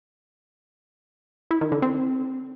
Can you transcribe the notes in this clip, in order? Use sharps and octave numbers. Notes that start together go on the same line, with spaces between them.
E4
D#3
D3
C4